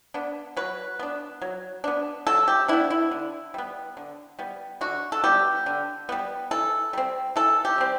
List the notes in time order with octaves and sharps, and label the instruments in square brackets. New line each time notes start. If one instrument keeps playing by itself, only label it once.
[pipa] B3 D4
F#3 B4
B3 D4
F#3
B3 D4
F#3 A4
G4
B3 D4 E4
E4
D3
G3 B3
D3
G3 B3
D3 F#4
A4
G3 B3 G4
D3
G3 B3
E3 A4
G3 C4
E3 A4
G4
G3 C4